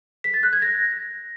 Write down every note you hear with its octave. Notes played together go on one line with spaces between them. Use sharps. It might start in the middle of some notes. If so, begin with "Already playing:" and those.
B6
A6
F#6
G#6
A#6